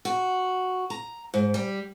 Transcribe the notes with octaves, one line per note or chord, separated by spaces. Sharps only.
F#4
A#5
G#2
G3